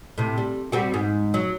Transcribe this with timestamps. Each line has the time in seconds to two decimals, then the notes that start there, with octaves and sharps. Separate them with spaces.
0.18 A2 C3
0.38 G3
0.72 G3 C4 F#4
0.94 G#2
1.34 F#3